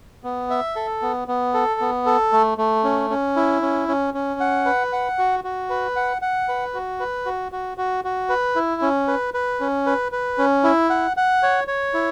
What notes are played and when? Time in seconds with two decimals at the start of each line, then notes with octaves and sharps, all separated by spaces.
0.24 B3
0.50 E5
0.76 A4
1.02 B3
1.28 B3
1.54 A4
1.81 B3
2.06 A4
2.33 A3
2.58 A3
2.84 C#4
3.10 C#4
3.36 E4
3.62 C#4
3.88 C#4
4.14 C#4
4.40 F#5
4.65 B4
4.93 F#5
5.18 F#4
5.44 F#4
5.70 B4
5.96 F#5
6.22 F#5
6.49 B4
6.74 F#4
7.00 B4
7.26 F#4
7.52 F#4
7.78 F#4
8.04 F#4
8.30 B4
8.56 E4
8.82 C#4
9.08 B4
9.34 B4
9.60 C#4
9.87 B4
10.12 B4
10.38 C#4
10.64 E4
10.90 F#5
11.17 F#5
11.43 C#5
11.68 C#5
11.94 E4